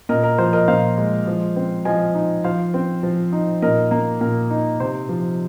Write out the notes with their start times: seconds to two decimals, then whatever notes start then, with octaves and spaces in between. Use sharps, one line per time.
0.09 A#2 A#4 D#5
0.24 A#4
0.38 F3 C5
0.53 A#4 D#5
0.68 A#2 C5 F5
0.98 G#3
1.27 F3
1.56 C4
1.85 F3 D#5 G#5
2.15 D#4
2.44 F3 C5 F5
2.74 C4
3.03 F3
3.32 D#4
3.62 A#2 A#4 D#5
3.91 A#3
4.21 A#2 A#4
4.50 D#4
4.80 C3 C5
5.09 F3